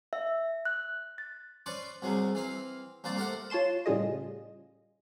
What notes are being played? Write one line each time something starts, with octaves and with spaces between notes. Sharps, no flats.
E5
F#6
A6
C#4 B4 C5 D5 C#6
C2 C3 F#3 G#3
E3 C4 F5
C2 A#3 C5 D5
A3 G4 A#4 C5 F#5
F4 C#5 A5 C6 E7
A2 C#3 G3 F4 G#4 D#5